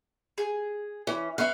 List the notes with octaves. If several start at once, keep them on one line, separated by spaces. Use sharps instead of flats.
G#4
E3 C#4
B3 E5 F5 C#6